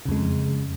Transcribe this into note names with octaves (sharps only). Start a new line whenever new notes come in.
F2 C#3 G#3